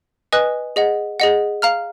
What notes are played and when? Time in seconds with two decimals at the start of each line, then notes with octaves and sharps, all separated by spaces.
0.32 B4 D#5 G#5 D#6 F#6
0.76 G#4 D#5 F#5
1.20 G#4 D#5 F#5
1.62 F5 A#5 F6